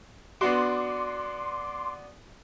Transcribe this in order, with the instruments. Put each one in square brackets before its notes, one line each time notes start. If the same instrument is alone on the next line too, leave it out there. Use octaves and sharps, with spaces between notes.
[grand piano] B3 D4 F#4 [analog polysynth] C6 D6